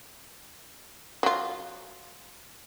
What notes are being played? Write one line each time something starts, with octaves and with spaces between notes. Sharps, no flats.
F#3 F4